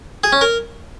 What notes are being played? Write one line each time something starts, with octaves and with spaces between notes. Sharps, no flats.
G#4
C#4
A#4